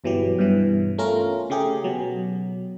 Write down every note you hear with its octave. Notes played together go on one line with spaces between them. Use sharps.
G1 B2 E3 F#3 G4
G2 B2 E3
A3 C#4 F4 A#4
C#3 A3 G4 G#4
B2 F#3